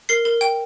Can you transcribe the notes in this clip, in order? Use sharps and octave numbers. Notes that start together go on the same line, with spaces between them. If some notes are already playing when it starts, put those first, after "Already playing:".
A#4 C7
A#4
G5